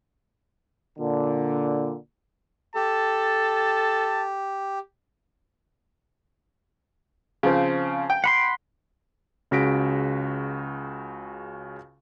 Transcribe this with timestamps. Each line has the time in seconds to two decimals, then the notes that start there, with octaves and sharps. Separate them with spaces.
0.99 A#2 D3
2.76 G4 A4 A5
7.43 C#3 F3 C4
8.10 G5
8.24 F#5 B5 C6
9.51 C#2 C#3 F#4 A#6 B6 D7